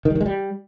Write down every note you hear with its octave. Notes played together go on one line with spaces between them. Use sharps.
D#3
G3
D#3
G#3
G3